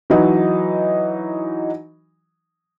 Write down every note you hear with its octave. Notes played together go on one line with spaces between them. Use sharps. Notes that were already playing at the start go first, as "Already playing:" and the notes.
E3 F#3 D#4